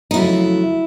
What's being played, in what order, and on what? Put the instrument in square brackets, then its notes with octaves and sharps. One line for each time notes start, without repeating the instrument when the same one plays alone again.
[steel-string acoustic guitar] D#4
F2 C#3 F#3 A3 E4